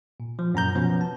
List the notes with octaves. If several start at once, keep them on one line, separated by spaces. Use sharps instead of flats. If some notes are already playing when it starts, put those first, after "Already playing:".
A#2
F3
F#2 A#2 A#5 G6
B2 F3 B3 C#4
A5